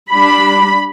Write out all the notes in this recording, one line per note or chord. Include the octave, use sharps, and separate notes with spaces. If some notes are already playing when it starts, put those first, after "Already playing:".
G3 D4 B5